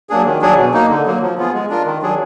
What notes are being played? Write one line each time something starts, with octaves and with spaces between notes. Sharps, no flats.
F#3 A#3 D4 G#4
D#3
F#3 D4 G#4
B2
A#3 D#4
D3
F#3 A#3
F3
B3 F4 G#4
G#3
D4 F4 A#4
D#3
F#3 D4 G#4